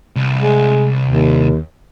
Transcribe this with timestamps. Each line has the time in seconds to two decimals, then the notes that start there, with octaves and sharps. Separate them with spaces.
0.16 C2
0.41 G#3
1.08 D#2